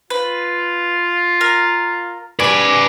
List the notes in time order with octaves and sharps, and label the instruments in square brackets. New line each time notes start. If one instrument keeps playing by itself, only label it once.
[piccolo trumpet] F4 [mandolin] B4
[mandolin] A#4
[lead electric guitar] B4 D5 [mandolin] G#5 B5